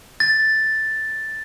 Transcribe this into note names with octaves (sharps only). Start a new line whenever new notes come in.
A6